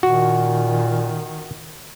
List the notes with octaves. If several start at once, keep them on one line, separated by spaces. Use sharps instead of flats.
A#2 D#3 F#4